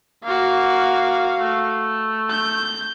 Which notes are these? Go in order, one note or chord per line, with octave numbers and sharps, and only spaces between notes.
A#3 F#4 F5
A3
G6